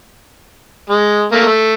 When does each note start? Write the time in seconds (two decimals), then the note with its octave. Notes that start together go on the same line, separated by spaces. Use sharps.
0.90 G#3
1.32 A3 A#3
1.46 A3